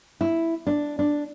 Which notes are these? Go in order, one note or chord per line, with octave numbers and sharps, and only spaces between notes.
E4
D4
D4